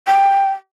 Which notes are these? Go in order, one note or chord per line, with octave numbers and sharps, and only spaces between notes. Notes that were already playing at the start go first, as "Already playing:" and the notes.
G5